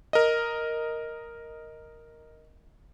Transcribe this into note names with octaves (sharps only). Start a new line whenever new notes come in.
A#4 D#5